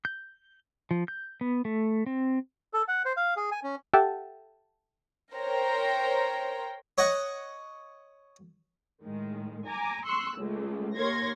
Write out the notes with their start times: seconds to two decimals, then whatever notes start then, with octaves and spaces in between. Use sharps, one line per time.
0.05 G6
0.91 F3
1.08 G6
1.41 B3
1.65 A3
2.06 C4
2.73 A4
2.88 F#5
3.05 C5
3.17 F5
3.36 G#4
3.52 G#5
3.63 C#4
3.93 G4 A4 E5 F#5 G5 A5
5.35 A#4 C5 C#5 G5 A#5
6.98 C#5 D#5 F#5 C#6
9.02 A2 D#3 G#3
9.65 G#5 A#5 D6
10.05 C6 C#6 E6 F#6
10.37 C#2 G#3 A3
10.96 D#2 A#4 C#5 C6 G#6 A#6